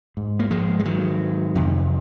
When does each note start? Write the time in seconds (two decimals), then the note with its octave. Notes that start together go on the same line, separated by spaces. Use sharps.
0.17 G#2
0.39 A#3
0.51 F3 G#3
0.79 G#3
0.85 D#3 F#3
1.55 F2 C3